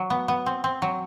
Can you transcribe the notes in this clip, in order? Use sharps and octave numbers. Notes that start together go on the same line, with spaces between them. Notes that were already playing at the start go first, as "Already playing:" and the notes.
Already playing: F#3
B3
B3
C4
C4
F#3